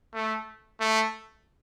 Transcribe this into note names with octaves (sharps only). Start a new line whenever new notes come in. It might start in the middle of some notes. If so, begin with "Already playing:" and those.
A3
A3